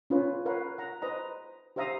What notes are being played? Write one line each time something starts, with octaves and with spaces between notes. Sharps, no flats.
C#4 F4 B4 C#5
A#4 B4 C#5 F5 F#5
F#5 A#5
B4 C5 D#5 A#5
G4 C5 E5 F5 A#5 D#6